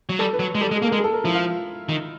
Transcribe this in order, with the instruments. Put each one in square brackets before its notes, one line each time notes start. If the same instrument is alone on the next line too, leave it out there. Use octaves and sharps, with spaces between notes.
[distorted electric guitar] F#3
[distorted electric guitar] G3 [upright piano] A4
[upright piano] B4
[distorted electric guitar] F#3
G#3
[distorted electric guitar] G3 [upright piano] A4
[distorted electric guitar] G#3
[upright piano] G#4
[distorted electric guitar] A#3 [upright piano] A4
[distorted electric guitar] G#3 [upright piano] A#4
[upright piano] G#4
A4
A#4
[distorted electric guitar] F3 [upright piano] E4
[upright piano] F4
[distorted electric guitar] D#3